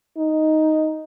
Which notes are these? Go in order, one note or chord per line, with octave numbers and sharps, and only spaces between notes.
D#4